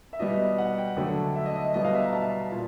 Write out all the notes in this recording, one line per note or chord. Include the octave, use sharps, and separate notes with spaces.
E5
B2 G3 D#5
F#5
G5
D3 F#3 A3
E5
D#5
D#5
B2 G3 D#5
F5
E5
A#5
A5
A#2